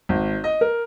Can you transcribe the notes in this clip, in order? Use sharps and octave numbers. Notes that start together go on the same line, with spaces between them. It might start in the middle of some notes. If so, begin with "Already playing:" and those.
G#1
D#5
A#4